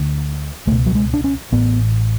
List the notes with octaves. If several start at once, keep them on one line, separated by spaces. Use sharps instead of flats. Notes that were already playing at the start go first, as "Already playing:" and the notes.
Already playing: D2 D3
C#2 B2 A3
F#3
G#3
D4
C#4
A1 A2 B3